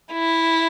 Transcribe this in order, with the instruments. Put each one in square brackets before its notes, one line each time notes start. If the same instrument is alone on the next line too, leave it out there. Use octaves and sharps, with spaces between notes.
[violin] E4